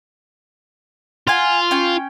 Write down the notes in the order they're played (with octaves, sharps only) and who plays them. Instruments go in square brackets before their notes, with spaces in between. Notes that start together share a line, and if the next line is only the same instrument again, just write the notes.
[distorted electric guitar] F4 [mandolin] F#5 G#5
[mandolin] C#4 G5